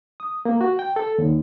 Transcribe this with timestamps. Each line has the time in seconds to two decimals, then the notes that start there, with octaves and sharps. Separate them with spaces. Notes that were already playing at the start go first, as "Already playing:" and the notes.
0.20 D#6
0.45 A#3
0.61 F#4
0.79 G5
0.96 A4
1.18 D#2